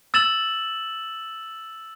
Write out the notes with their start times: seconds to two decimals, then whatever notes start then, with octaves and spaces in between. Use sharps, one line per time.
0.14 E6 A6 E7 F#7